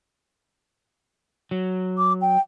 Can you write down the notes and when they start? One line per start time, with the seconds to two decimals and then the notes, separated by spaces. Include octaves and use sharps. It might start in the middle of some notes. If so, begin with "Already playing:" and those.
1.51 F#3
1.98 D6
2.22 G5